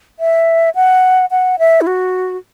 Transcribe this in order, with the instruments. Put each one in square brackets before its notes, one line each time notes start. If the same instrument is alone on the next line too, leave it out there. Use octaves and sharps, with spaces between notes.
[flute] E5
F#5
F#5
E5
E4
F#4